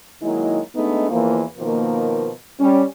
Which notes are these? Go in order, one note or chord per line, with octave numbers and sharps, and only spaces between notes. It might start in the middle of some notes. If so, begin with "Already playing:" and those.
D#3 F#3 G#3 A#3 D#4 E4
G#3 A3 B3 D4 D#4
E2 E3 F3 A#3
B2 D#3 F3 A#3
G3 C#4